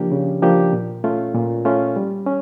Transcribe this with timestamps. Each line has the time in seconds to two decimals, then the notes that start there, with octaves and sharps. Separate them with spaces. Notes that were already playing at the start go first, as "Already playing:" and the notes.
Already playing: C#3 F3 A#3 D4 G4
0.11 C#3
0.42 F3 A#3 D4 G4
0.73 A#2
1.04 A3 C#4 F4
1.35 A#2
1.65 A3 C#4 F4
1.96 G3
2.26 C#4